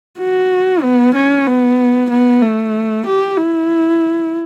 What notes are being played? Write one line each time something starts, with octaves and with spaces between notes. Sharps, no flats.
F#4
B3
C#4
B3
B3
A3
G4
E4